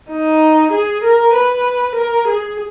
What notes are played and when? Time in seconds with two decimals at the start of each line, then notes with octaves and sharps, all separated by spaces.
0.10 D#4
0.72 G#4
1.04 A#4
1.34 B4
1.96 A#4
2.28 G#4